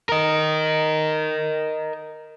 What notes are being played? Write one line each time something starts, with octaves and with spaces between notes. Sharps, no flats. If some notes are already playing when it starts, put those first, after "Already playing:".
A#4 D#5